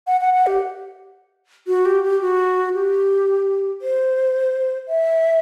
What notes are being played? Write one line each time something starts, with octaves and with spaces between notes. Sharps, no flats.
F#5
F#5
F#5
G4
F#4
G4
G4
F#4
G4
C5
E5